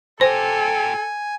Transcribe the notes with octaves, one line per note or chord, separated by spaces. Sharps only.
A#2 G4 A4 C5 G#5